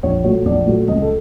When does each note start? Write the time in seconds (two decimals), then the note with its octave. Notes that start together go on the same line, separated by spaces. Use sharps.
0.03 A#1 C#5
0.24 A#2 F#3 A3 C#5
0.45 A#1 D5
0.67 A#2 F#3 A3
0.88 C#2 D#5
1.02 A4